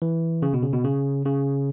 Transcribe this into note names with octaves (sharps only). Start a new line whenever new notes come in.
E3
C#3
B2
C#3
B2
C#3
C#3